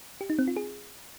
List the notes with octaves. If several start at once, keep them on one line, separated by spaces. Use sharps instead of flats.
G4
D#4
C4
F4
G#4